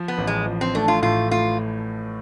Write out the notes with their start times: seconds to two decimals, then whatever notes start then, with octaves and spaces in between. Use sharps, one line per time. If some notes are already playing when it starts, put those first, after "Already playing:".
Already playing: F3
0.08 B3
0.18 A1
0.27 G#3
0.46 F3
0.61 C4
0.75 A3 D4
0.88 F4
1.02 A2 F4
1.31 A3 F4